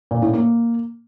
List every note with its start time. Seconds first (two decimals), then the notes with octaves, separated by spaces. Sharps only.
0.11 A#2
0.22 A2
0.33 A#3